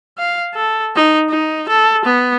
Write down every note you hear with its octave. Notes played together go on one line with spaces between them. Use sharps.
F5
A4
D#4
D#4
A4
B3